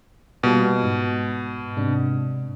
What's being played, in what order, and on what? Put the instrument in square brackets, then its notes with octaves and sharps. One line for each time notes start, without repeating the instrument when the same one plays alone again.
[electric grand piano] B2 [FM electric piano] G3 A#3 F4
[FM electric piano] G#2
G#2 C3 D4